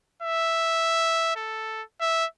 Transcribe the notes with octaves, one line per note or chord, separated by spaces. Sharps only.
E5
A4
E5